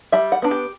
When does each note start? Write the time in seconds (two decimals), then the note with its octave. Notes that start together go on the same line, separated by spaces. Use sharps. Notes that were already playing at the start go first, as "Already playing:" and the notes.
0.12 G3 E5
0.32 F#5
0.42 B3 D4
0.51 G4